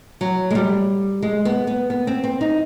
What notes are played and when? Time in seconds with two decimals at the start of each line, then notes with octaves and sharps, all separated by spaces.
0.21 F#3
0.51 G#3
0.55 G3
1.23 G#3
1.45 B3
1.67 B3
1.90 B3
2.07 C4
2.24 C4
2.41 D#4